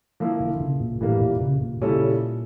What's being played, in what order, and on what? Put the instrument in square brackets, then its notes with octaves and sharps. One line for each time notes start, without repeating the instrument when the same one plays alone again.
[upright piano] F3 A#3 E4
[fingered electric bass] D3
C#3
A#2
[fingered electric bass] A2 [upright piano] E3 G3 A#3
[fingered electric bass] A#2
C#3
A#2
[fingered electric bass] A#2 [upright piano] C#3 G3 C#4 E4 A4